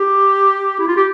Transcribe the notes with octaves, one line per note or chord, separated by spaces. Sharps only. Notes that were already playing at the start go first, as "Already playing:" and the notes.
Already playing: G4
E4
F4
G4